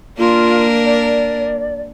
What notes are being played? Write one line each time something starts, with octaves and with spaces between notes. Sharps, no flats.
A#3 D4 F4 A#4
D5